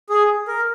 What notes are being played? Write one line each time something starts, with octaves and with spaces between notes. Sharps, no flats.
G#4
A#4